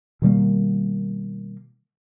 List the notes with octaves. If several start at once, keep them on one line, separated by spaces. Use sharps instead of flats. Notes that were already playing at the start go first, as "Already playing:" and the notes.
B2 D#3 G3 A#3